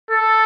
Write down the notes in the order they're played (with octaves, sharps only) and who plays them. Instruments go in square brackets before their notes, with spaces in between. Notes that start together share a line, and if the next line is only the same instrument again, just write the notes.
[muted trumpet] A4